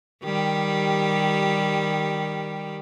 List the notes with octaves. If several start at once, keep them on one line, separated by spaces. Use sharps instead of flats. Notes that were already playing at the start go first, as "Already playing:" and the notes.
D#3 G3 G4